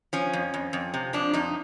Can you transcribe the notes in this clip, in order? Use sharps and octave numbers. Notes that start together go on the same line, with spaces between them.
F3 C#4
F2
F2
F2
C3
F3 D4
F2 D#4